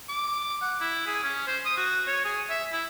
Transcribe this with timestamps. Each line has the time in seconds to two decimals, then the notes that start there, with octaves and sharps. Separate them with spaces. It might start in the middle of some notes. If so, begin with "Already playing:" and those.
0.08 D6
0.61 F#5
0.80 E4
1.07 G#4
1.23 C#4
1.47 C5
1.65 D#6
1.77 F#4
2.07 C#5
2.24 G#4
2.49 E5
2.72 E4